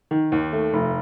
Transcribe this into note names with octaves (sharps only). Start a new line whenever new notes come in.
D#3
D#2
A3
F1